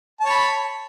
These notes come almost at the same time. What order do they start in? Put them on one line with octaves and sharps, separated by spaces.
A5 C#5 B5